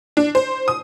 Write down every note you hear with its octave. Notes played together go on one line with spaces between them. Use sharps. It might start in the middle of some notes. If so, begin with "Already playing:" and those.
D4
C5
D#6